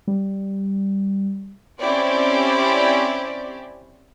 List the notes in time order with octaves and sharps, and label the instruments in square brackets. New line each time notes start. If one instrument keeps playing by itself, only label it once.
[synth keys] G3
[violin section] C4 C#4 E4 G4 C5 D5